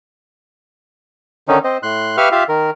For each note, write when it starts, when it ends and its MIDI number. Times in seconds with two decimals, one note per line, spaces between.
1.48 1.58 50
1.48 1.58 51
1.48 1.58 61
1.48 1.58 63
1.64 1.78 60
1.64 1.78 72
1.64 1.78 75
1.83 2.16 45
1.83 2.16 84
1.83 2.16 90
2.17 2.29 67
2.17 2.29 71
2.17 2.29 76
2.17 2.29 77
2.17 2.29 85
2.17 2.29 89
2.32 2.44 65
2.32 2.44 67
2.32 2.44 76
2.32 2.44 77
2.49 2.70 51
2.49 2.70 70